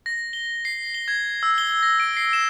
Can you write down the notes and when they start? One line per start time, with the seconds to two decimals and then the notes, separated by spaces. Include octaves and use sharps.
0.06 A#6
0.33 G7
0.65 C7
0.94 G7
1.08 G#6
1.43 E6
1.58 G7
1.83 A#6
2.00 D7
2.17 C7
2.33 E7